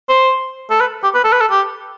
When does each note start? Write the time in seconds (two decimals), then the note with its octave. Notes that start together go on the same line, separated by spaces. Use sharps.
0.09 C5
0.70 A4
0.81 B4
1.03 G4
1.14 B4
1.24 A4
1.32 B4
1.41 A4
1.51 G4